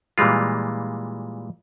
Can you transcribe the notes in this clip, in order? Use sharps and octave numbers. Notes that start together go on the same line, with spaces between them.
A#2 E3 G3 G#3 F4